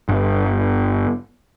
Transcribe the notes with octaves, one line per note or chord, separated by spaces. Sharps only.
G1